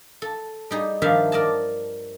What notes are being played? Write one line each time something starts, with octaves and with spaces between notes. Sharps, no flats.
A4
G3 D#4 G#4
G2 D#3 F3 E5 F5 A5
A#4 D5 D#5 A5